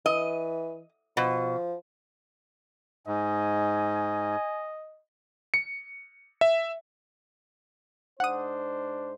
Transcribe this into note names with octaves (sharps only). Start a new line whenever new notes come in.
E3 D#5
B2 F3
G#2 D#5 G#5
C#7
E5
G#2 D4 C5 F#5 D#6